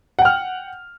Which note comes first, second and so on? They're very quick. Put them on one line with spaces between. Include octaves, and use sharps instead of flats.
F#5 G5 F6